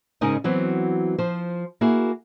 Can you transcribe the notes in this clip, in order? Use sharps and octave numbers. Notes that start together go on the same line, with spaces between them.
G#2 C#3 D#4 A#4 D#5 G#5
E3 F#3 B3 C4 F#4
F3 C5
A#3 E4 F#4 G#4